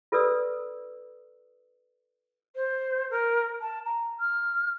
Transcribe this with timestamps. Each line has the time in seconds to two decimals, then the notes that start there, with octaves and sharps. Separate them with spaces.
0.12 F4 A4 B4 D5 D#6 E6
2.55 C5
3.10 A#4
3.60 A5
3.85 A#5
4.19 F6